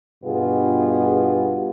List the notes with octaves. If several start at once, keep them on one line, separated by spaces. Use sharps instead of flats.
G2 B2 B3 F4 G4 G#4